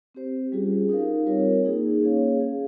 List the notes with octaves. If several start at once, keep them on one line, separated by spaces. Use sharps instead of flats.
C4 G4 C5
G3 C#4 F4 G#4
D#4 G4 A#4 F5
G3 C4 F4 A#4 C#5
A#3 D#4 G#4
A#3 C#4 G#4 C#5 F5
C#4 G#4 C#5 F5